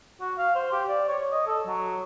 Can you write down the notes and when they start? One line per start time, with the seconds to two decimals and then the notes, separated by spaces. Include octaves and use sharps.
0.21 F#4
0.38 F5
0.55 C5
0.72 G4
0.88 D5
1.09 C#5
1.32 D#5
1.47 A4
1.66 F#3